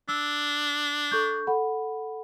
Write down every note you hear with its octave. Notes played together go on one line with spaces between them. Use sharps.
D4 E6
A4 C#6 G6
A4 F#5 B5